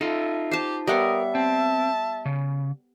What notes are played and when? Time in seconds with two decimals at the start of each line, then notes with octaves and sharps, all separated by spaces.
0.01 D#4 F4 A4 E5
0.51 G4 C5 A5
0.87 G3 B3 A#4 C#5 D#5 E5
1.35 C4 A5
2.25 C#3